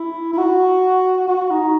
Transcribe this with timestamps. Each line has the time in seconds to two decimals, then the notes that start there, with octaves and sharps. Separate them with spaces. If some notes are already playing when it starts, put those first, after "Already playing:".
Already playing: E4
0.33 E4
0.38 F#4
1.28 F#4
1.51 D#4